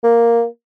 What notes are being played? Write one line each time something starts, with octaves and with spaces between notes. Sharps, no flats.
A#3